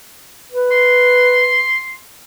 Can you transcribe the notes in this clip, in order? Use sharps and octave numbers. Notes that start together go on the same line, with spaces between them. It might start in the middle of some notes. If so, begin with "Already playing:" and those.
B4
C6